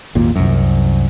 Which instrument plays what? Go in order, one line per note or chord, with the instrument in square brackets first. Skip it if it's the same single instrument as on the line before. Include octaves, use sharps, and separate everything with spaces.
[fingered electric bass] G#1 D#2 A#2
C2 F#2